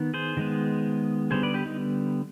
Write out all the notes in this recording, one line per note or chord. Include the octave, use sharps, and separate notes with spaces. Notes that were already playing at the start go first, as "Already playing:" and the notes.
Already playing: D#3 B3
G#4 C5
D#3 G#3 B3
D3 G3 B3 G#4 C5
B4 D5
G4 B4
D#4